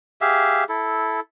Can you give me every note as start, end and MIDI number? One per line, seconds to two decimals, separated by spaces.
0.21 0.64 67
0.21 0.64 68
0.21 0.64 76
0.21 0.64 77
0.69 1.20 64
0.69 1.20 69